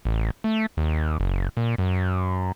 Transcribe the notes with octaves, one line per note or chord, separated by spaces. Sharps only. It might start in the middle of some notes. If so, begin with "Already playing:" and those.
A1
A3
D#2
F#1
A#2
F#2